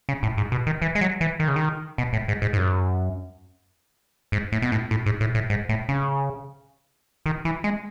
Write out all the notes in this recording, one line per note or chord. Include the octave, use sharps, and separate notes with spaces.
C#3
A2
G#2
B2
D#3
E3
G#3
F#3
E3
D#3
C#3
D#3
B2
A2
G#2
G#2
G#2
F#2
G#2
A2
B2
A2
A2
G#2
A2
A2
G#2
A2
C#3
D#3
E3
G#3